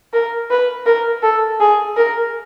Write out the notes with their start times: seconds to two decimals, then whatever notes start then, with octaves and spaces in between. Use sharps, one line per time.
0.13 A#4
0.51 B4
0.86 A#4
1.23 A4
1.61 G#4
1.97 A#4